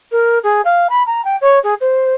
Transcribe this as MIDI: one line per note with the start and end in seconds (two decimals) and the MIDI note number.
0.11 0.38 70
0.43 0.61 68
0.64 0.87 77
0.89 1.02 83
1.06 1.24 82
1.24 1.36 79
1.41 1.59 73
1.63 1.74 68
1.80 2.14 72